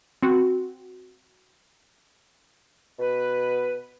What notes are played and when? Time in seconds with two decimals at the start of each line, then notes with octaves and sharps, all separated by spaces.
0.23 C4 F#4
2.99 B2 B4